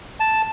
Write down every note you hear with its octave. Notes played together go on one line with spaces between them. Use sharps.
A5